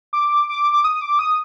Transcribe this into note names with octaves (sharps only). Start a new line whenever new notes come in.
D6
D6
D6
D#6
D6
D#6